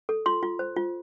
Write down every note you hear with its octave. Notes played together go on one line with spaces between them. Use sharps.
A4
F4 C6
F4
C5
F4